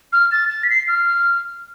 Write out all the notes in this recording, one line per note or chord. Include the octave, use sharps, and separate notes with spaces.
F6
A6
A6
B6
C7
F6